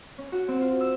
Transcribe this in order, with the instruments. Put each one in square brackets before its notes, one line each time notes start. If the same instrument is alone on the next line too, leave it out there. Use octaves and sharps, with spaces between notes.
[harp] C#4
F#4
C4
F4
E6